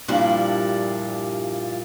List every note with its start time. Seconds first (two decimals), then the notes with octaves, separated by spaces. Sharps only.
0.08 G2 A#2 F3 G3 D4 E4